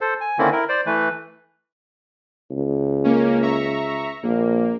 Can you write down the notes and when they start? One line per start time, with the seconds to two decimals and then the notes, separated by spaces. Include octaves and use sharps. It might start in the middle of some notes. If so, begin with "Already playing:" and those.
0.01 A4 C5
0.21 G#5
0.39 D3 D#3 A#3 C4 C#4 E4
0.53 E4 A#4
0.69 C5 D5
0.86 E3 A3 B4
2.51 C#2
3.04 A#3 C#4
3.42 E5 A#5 C#6
4.23 A#1 A#3